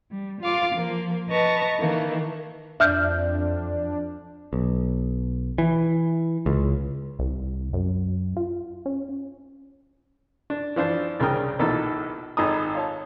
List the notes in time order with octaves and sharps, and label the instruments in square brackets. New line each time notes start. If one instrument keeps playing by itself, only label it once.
[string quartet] G3
F4 F5 D6
F3 A#3
B4 D#5 A5 A#5 C#6
D#3 E3 A3 A#3
[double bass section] F2 [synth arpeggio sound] D4 [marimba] E5 F6 G6
[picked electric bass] B1
E3
C#2
[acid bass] C2
F#2
F4
C#4
[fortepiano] D4
E3 F3 D4 C5
C2 C#3 D4 A#4 G5 D#6
A#1 B2 D#3 E3 A#3 A4
G#1 D#4 A4 A#5 D#6
F4 C#5 A5